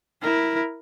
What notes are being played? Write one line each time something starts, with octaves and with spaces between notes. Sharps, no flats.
E4 A#4